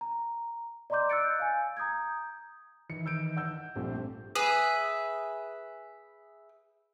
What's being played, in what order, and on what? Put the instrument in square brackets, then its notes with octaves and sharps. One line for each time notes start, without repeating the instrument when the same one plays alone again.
[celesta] A#5
D5 D#5 A#5 C6 D6 G6
E6 F#6 G6 A6 C#7 D7
F5 G#5
A#5 D#6 G6 G#6
[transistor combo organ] D#3 E3 [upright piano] C#7
[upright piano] E6 G6 D7
F#5 E6 G6
[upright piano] A#1 [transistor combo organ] G3 A3 C4
[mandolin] G#4 B4 E5